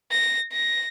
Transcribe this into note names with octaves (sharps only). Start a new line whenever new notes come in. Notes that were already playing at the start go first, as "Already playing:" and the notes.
A#6
A#6